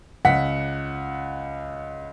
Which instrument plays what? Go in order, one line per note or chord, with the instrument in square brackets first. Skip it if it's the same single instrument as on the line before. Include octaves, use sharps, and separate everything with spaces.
[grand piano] C#2 F#5 B6